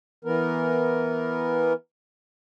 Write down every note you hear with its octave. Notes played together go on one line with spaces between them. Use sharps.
E3 B3 A#4